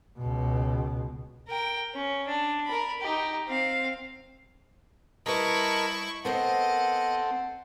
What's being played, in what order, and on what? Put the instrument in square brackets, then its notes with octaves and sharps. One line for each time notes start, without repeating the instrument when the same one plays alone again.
[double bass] C#2 B2
[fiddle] A#4 G5
C#4
D4
A#4 B5
D#4 G4
C4 F5
[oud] G3 B4 [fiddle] E4 C#6 [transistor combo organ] A#4 D#5 A5
[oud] B3 A#4 C5 [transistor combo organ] C4 A4 [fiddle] D#5 [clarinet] F#5